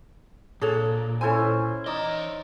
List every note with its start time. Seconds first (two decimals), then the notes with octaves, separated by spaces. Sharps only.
0.62 A#2 D4 G#4 A4 C#5
1.21 C#4 E4 A4 C5 G#5
1.86 E3 D#4 D5 D#5